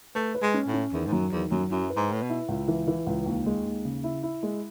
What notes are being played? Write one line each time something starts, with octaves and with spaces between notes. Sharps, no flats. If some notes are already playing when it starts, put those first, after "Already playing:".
A3 B4
B4
G#3
C#4
A2
C#4
E2 D#3
G#2
F#2 F#3
E2 D#3
F#2 F#3
F#2 E4
B4
G#2
A2 B4
B2
E4
C#2
E3
E3
C#2
D#2
G#3
D#2
C#3
E4
E4
G#3